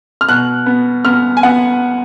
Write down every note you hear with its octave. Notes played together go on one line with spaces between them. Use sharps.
F6
B2 F#6
B3
B3 F6
G#5
B3 F#5